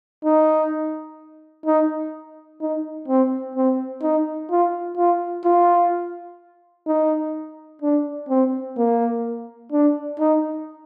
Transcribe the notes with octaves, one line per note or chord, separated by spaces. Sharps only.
D#4
D#4
D#4
C4
C4
D#4
F4
F4
F4
D#4
D4
C4
A#3
D4
D#4